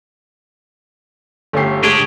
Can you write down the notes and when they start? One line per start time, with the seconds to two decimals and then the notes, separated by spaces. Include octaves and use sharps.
1.53 G1 A3 C#4 G4 C7
1.84 G#3 D4 G4 C#6 G#6 D7